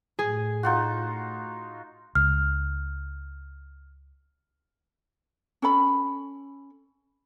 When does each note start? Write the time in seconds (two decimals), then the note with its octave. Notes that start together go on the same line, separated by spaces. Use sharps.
0.19 A2 G#4
0.63 D#4 F4 F#4
2.15 C#2 F6
5.62 C#4 A4 B5